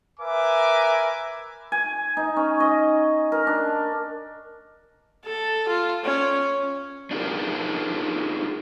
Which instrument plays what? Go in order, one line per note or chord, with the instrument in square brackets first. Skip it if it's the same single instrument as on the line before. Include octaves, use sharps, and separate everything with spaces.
[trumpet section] A#4 B4 E5 G#5 D6
[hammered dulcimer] G#5
D#4
C#4
D#5
A#4
D4
[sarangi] A4
F4
C#4
[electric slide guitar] D4 D#4 F4 G4 G#4 A#4